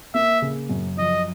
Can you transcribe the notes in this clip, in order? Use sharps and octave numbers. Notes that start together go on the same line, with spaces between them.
A#3 E5
C#3
F#2
F3 D#5